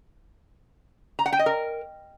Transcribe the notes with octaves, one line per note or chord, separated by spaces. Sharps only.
A#5
F#5
G5
D#5
A#4